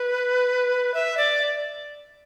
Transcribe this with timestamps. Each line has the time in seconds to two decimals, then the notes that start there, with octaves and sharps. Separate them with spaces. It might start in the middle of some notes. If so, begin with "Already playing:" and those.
Already playing: B4
0.94 E5
1.17 D5